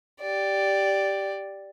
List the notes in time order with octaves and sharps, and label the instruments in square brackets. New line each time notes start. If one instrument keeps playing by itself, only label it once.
[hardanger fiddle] G4 D5